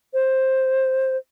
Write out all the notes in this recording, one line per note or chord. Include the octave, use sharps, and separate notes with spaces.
C5